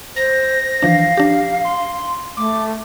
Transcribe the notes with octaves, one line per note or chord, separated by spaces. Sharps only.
C5 A#6
E3 F3 D4 F5
D4 G4
C6
A3 D6